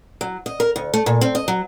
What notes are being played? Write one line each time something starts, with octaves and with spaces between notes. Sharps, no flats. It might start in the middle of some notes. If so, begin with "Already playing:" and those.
F#3
D#5
A#4
D2
A3
A#2
C4
D#5
F#3